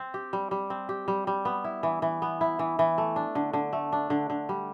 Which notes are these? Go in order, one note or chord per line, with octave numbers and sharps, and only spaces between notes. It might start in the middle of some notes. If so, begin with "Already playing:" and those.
Already playing: C4
G4
G3
G3
C4
G4
G3
G3
B3
E4
E3
E3
B3
E4
E3
E3
A3
D4
D3
D3
A3
D4
D3
D3
G3